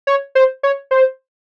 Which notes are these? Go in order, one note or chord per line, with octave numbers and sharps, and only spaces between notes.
C#5
C5
C#5
C5